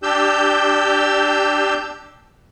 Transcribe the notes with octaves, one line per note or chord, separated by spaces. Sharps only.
D4 G4 E6 G6